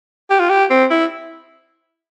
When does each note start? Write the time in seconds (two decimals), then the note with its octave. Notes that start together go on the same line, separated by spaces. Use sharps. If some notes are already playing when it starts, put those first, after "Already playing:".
0.30 G4
0.39 F4
0.50 G4
0.70 C4
0.90 E4